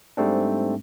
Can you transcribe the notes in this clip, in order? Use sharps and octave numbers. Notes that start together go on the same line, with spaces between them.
G#2 G3 A3 C4 D4